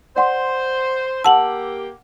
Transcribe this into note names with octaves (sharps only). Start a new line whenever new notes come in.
C5 D5 F#5 C6
A#3 G4 F#5 A5 E6 F#7